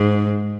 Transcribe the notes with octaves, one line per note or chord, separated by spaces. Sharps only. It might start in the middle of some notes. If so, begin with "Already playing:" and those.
Already playing: G#2